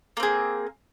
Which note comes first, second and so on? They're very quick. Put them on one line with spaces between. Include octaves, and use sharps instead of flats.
A#3 C4 G#4